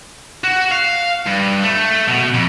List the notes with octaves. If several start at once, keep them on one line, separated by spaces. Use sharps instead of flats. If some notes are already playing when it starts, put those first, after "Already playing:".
F#4
F5
G2
A3
B2
F2